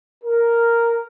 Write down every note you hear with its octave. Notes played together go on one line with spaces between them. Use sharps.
A#4